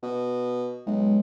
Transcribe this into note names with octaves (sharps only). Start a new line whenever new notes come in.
B2
B1 G#3